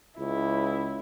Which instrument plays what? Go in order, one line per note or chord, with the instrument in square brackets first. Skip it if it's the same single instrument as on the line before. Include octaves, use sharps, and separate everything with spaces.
[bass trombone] C#2 [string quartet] E4